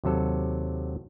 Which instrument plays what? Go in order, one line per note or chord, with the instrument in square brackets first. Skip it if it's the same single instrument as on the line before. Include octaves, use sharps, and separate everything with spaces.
[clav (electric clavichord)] D#2 C3 F#3 A4